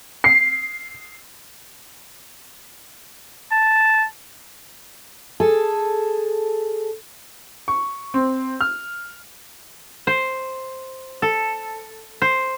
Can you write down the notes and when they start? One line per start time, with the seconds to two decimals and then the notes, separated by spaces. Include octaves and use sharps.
0.24 C7
3.52 A5
5.40 G#4 A4
7.68 C#6
8.14 C4
8.61 F6
10.07 C5
11.22 A4
12.22 C5